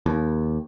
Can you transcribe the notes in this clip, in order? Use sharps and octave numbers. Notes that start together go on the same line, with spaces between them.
D#2